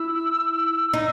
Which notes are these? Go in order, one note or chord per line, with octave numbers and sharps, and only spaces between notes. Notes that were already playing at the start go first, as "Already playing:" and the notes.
Already playing: E4 E6
D#4